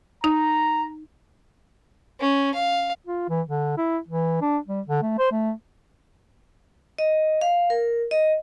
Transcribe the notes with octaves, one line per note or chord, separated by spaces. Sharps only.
D#4 A#5
C#4
F5
F4
E3
D3
E4
E3
D4
G3
D3
A3
C5
A3
D#5
F5
A#4
D#5